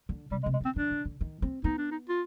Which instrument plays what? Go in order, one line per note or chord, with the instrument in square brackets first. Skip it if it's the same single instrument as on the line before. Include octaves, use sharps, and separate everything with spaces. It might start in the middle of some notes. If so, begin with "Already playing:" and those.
[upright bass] D3
[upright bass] C3 [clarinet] G3
[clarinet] G#3
[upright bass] C3
[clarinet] G#3
[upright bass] D3 [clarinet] C4
[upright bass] D#3 [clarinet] D4
[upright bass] D3
D3
D#3
C4
[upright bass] B3 [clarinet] D#4
[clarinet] D4
D#4
F4